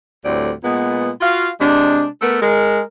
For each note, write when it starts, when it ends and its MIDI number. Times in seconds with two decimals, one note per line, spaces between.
0.25 0.51 38
0.25 0.51 45
0.25 0.51 55
0.25 0.51 60
0.25 0.51 74
0.64 1.11 46
0.64 1.11 56
0.64 1.11 59
1.21 1.49 65
1.21 1.49 66
1.21 1.49 77
1.60 2.06 48
1.60 2.06 56
1.60 2.06 62
2.21 2.39 57
2.21 2.39 59
2.21 2.39 69
2.21 2.39 70
2.41 2.81 56
2.41 2.81 70